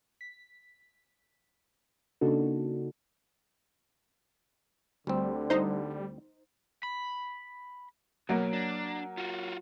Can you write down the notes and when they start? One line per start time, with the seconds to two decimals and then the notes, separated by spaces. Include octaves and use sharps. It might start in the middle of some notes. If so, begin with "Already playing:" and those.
0.21 B6
2.21 C#3 A#3 D4 D#4 F#4 A4
5.07 D2 D3 G3 C4
5.50 D#4 C5
6.83 B5
8.29 B2 F#3 A#3
8.53 D4
9.18 F4 F#4